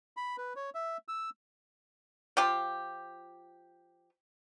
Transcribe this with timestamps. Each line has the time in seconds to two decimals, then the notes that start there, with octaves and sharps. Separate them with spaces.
0.17 B5
0.38 B4
0.56 C#5
0.75 E5
1.08 E6
2.37 F3 F4 G4